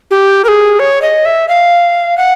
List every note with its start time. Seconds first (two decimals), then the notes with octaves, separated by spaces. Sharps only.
0.11 G4
0.44 A#4
0.48 G#4
0.79 C#5
1.02 D#5
1.25 E5
1.48 F5
2.17 F#5